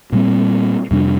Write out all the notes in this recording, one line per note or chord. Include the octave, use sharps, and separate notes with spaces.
A#2 G3 C4
F2 C3 G3 D4